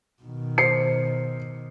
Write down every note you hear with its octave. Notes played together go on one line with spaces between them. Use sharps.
B2 D#3
C5 C7 C#7